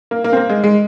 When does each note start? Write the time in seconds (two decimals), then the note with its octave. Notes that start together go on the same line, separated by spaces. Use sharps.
0.11 A#3
0.24 A#3
0.33 C4
0.37 A#3
0.49 G#3
0.64 G#3